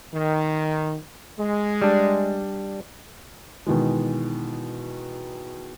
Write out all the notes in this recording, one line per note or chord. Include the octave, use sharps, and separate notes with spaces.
D#3
G#3
G3 D4
B2 D#3 E3 G#3